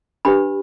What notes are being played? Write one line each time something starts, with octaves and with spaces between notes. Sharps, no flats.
D4 G4 B4 B5